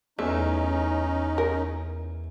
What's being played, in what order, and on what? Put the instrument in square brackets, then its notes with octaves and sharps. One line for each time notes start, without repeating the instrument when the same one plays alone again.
[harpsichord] E2 [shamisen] A3 [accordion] C#4 D#4
[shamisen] A#4